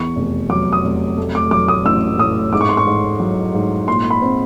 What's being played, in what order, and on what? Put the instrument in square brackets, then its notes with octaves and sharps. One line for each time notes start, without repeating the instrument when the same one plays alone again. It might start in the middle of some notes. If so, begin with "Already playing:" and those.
Already playing: [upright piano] E2 C#6
F1
F#3 D6
D#6
F1
A3
D6
F#3 D6
D#6
A1 E6
A2 D#6
G#2 D6
C#6
C6
C#6
G#2
F#3
G#2
A#2 C6
B5
C4